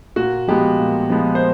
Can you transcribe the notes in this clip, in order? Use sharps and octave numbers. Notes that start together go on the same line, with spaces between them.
A#2 F#4
F3 G#3 B3 G4
A#2
F3 G#3 B3
C5